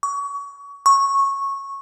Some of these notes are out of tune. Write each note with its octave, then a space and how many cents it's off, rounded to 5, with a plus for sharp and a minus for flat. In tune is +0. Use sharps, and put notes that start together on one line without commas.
C#6 +30
C#6 -10